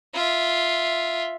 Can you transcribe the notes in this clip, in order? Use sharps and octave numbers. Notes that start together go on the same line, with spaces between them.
F4 E5